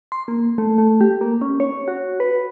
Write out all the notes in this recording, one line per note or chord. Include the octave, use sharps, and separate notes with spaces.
C6
A#3
A3
A3
G4
A#3
C#4
C#5
F#4
B4